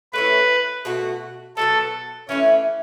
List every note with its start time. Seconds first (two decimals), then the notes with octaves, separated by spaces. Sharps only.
0.13 A3 C#4 E4 B4
0.85 B2 A3 F#4
1.57 B2 F#3 B3 A4
2.29 E3 A3 C#4 E4